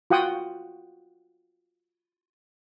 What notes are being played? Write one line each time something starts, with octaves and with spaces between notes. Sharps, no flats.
F4 F#4 F#5 G5 D#6